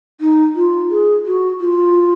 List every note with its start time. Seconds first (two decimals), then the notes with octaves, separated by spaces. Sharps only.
0.21 D#4
0.56 F4
0.91 G#4
1.25 F#4
1.60 F4